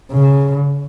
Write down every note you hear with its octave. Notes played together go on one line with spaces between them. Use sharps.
C#3